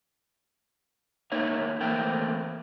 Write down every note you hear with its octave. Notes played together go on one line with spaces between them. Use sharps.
A#3 D#4 A#4 C#5 E5
E3 A3 A#3 C4 A4 G5